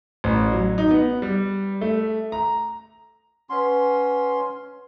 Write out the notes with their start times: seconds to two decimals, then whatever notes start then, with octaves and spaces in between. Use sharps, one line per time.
0.24 A1
0.52 F#3
0.78 D#4
0.91 B3
1.22 G3
1.81 A3
2.32 A#5
3.50 C#4 B4 F#5 C6